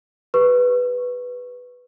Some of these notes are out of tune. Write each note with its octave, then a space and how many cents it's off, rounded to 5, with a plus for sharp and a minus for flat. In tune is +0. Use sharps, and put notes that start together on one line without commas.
G4 +35 B4 +0 C#6 -5